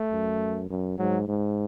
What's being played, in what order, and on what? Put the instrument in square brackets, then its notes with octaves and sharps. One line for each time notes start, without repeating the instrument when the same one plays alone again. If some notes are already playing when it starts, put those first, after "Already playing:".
Already playing: [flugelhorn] A3
[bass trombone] F#2
F#2
[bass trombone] G#2 [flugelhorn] F#3
[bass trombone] G#2